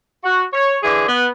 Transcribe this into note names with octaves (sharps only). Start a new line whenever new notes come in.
F#4
C#5
D3 E3 G#4
B3